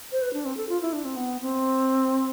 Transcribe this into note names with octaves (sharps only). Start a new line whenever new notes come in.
C5
B4
D4
C4
A4
F4
E4
D4
C4
B3
C4